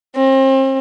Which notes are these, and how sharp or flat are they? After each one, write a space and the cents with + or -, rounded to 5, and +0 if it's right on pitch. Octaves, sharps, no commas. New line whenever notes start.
C4 +35